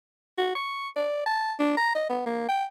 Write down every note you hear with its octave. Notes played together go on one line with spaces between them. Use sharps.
F#4
C#6
D5
A5
D4
A#5
D#5
B3
A#3
G5